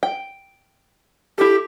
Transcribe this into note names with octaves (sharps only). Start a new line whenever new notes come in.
G5
E4 G4 A4